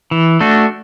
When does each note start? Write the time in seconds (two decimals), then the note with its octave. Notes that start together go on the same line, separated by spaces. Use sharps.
0.11 E3
0.40 A3 D4 F#4